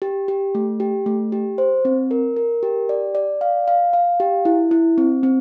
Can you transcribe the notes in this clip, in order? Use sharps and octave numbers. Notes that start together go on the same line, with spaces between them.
G4
G4
A3
G4
A3
G4
C5
C4
A#4
A#4
G4
D5
D5
F5
F5
F5
G4
E4
E4
C4
C4